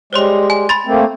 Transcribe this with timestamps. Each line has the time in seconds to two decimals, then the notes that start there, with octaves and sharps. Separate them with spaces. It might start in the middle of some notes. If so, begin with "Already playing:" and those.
0.13 G3 G#3 C5 C#5 C6
0.50 G#5
0.69 B5 C6 A6
0.86 A3 A#3 C4